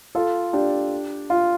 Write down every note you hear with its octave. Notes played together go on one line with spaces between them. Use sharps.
F4 A4
D4 G4
F4